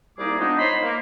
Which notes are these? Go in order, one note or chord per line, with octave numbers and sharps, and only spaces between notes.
C2 G3 A#3 D#4 G#4 D6
F3 G#3 B3 D4 D#4
D#4 C5 C#5 B5 C6
A#3